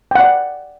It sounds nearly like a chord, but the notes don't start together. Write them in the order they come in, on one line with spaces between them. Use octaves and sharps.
G5 F#5 D5